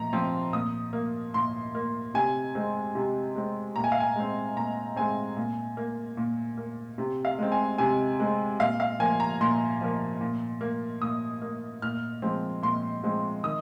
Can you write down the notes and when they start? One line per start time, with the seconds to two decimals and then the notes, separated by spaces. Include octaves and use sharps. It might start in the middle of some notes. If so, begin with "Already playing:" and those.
Already playing: A#2 F3 A#5
0.13 F3 C4
0.53 A#2 D#6
0.93 A#3
1.34 A#2 C6
1.75 A#3
2.14 C3 G#5
2.55 G#3 C4
2.95 C3
3.36 G#3 C4
3.76 A#2 A#5
3.84 G#5
3.92 F5
4.00 G#5
4.16 G#3 C4
4.56 A#2 A#5
4.96 G#3 C4 G#5
5.37 A#2
5.77 A#3
6.17 A#2
6.57 A#3
6.98 C3
7.25 F5
7.39 G#3 C4
7.52 G#5
7.78 C3 G#5
8.20 G#3 C4
8.59 A#2 F5
8.80 F5
8.99 F3 A#3 G#5
9.20 A#5
9.41 A#2 C6
9.81 F3 A#3
10.21 A#2
10.61 A#3
11.02 A#2 D#6
11.42 A#3
11.82 A#2 F6
12.22 F3 G#3 C4
12.62 A#2 C6
13.03 F3 G#3 C4
13.43 D#3 D#6